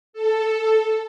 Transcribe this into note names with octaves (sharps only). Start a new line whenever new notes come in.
A4